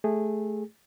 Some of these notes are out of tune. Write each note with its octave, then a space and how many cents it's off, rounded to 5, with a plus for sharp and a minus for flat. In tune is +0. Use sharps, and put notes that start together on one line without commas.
A3 -20 G#4 -20